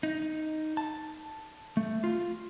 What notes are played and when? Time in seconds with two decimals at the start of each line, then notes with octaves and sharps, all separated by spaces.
0.03 D#4
0.77 A5
1.77 A3
2.04 F4